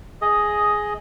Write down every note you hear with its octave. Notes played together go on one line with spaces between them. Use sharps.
G#4 D#5